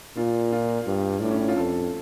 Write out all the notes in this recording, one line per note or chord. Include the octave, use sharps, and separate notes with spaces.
A#2 F4
F4
G2
A2 D4
C#4
D4
F4
F2 A4